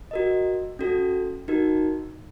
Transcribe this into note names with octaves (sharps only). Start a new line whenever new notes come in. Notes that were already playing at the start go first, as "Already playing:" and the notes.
F#4 A#4 D#5
C#4 F#4 A4
D#4 F#4 A#4